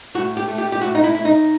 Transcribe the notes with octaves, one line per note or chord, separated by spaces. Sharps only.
A2 F#4
G4
A3
G4
G4
A2 F#4
D#4
E4
A2 E4
D#4